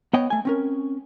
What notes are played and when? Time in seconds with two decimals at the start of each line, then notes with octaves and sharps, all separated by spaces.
0.13 B3 C#5 D#5 G5
0.30 A3 G#5
0.45 C4 C#4 A#4